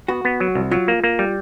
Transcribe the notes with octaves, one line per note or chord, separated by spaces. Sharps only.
B3 F#4
B3
F#3
C2
F#3 F4
A#3
A#3
G3